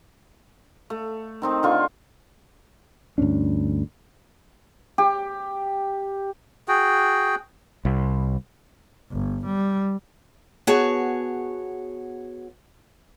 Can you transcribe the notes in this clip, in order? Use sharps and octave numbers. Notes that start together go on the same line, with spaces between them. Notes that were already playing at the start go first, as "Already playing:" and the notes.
A3
D#3 C4 D#4
D3 F4 C#6
D2 G2 C#4 D4
G4
F#4 G#4 G5
C2
G1
G3
B3 F#4 G#4 C#5 A5